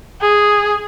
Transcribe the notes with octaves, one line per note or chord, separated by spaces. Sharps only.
G#4